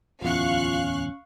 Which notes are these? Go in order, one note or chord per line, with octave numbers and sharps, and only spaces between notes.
D1 E2 C#4 F4 F5 C#6 F#6